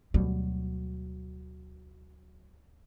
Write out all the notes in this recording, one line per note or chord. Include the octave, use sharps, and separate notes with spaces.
D2 B2 F#3 G3